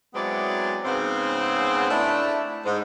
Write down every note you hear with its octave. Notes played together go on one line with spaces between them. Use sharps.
F#3 G#3 B3 C4 E4 D5
G#2 C#3 B3 C4
A3 D4 E4
G#2